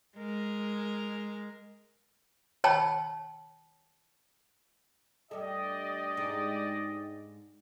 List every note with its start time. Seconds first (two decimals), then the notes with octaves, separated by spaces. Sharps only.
0.18 G#3 A#4
2.64 C#5 G5 A5 B5
5.31 G2 A3 G4 D5 D#5
6.17 G#2 G#3 D#4